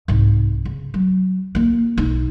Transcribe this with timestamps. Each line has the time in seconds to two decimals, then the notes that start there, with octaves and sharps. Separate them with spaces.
0.08 C2 G#2
0.65 C#3
0.94 F#3
1.55 A#3 F4
1.98 B1 D#4